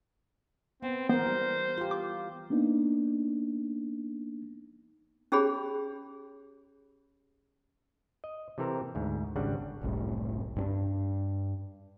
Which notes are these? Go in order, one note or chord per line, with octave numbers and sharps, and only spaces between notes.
B3 C4
E3 B3 A#4 C5
G3
F4 G4
D6
A#3 B3 D4 D#4
C#4 G4 G#4 C#5 B5
D#5
C3 E3 C4 A4 A#4
D2 G#2
G#1 C#3 G3 D4 F#5
F#1 C2 A2 G3
G2 C4 D4